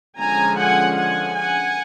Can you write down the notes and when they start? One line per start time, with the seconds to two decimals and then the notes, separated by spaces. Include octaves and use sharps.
0.17 D3 F3 G#3 C#4 G#5 A#5
0.58 F#5 G#5
0.96 F#5 G#5
1.36 F#5 G#5